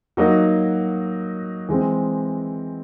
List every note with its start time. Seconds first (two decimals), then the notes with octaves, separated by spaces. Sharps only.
0.17 F#3 A#3 D#4 F#4
1.69 E3 G#3 C4